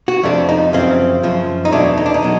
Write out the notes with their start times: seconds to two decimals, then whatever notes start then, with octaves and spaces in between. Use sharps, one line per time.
0.08 F#4
0.23 F2 C3 F3 A3 D4
0.49 D#4
0.73 F#2 C#3 F3 C4
1.23 F#2 C#3 F3
1.65 D#4
1.72 E2 B2 F#3 A3 D4
1.97 D#4
2.06 D4
2.14 D#4
2.22 B2 F#3